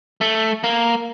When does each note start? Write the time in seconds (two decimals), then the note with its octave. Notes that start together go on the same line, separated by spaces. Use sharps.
0.21 A3
0.64 A#3